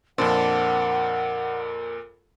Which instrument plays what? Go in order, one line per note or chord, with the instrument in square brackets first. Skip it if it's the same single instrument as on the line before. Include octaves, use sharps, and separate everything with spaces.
[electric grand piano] F2 A#2 [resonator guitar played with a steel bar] D4 C5 [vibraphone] A#4 [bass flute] F#5